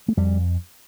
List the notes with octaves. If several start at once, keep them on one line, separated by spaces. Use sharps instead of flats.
A3
F2 G3